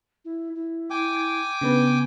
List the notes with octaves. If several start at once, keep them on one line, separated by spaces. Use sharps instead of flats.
E4
E4
G5 G#5 D6
G#6
C#3 B3 D4 B4